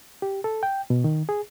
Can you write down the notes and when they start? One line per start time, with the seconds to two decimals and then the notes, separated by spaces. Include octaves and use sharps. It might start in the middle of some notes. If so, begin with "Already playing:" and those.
0.22 G4
0.44 A4
0.63 G5
0.90 B2
1.04 D#3
1.29 G#4